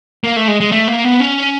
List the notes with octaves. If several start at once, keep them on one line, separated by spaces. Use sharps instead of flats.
A#3
A3
G#3
G#3
A3
A#3
B3
C#4